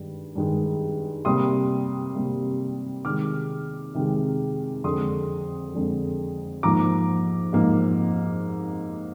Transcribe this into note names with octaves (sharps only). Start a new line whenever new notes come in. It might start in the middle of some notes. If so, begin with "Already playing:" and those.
Already playing: G2 D#3 G#3
G2 D#3 G#3
C3 G3 A#3 C6 D#6
C3 G3 A#3
C3 D#3 G#3 D6 F6
C3 D#3 G#3
F2 D3 G#3 C6 D#6
F2 D3 G#3
G#2 F3 A#3 A#5 D6
G#2 F3 A#3